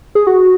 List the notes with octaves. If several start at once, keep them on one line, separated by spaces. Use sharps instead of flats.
G#4
F#4